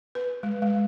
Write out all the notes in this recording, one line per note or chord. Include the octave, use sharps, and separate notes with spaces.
B4
G#3
G#3